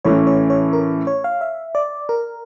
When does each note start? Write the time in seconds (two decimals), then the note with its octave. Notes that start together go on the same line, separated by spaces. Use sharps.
0.05 A2 E3 A3 C#4 C#5
0.27 C#5
0.50 C#5
0.73 A#4
1.07 C#5
1.24 F5
1.41 E5
1.75 D5
2.09 A#4